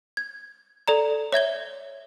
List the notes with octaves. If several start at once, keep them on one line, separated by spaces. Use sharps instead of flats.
G#6
A4 D5 A#5
C#5 E5 G#6 G7